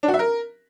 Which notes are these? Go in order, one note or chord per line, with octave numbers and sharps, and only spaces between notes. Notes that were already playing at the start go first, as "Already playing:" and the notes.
D4
F#4
E5
A#4